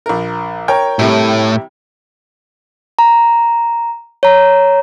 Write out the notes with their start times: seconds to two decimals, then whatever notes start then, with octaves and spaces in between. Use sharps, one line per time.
0.06 A#1 A#4
0.68 A#4 C#5 G5
0.99 A2 C3 G3 E4
2.99 A#5
4.23 C#5 A#5